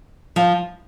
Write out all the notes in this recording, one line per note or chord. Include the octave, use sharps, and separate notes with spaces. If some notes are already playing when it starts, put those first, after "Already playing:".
F3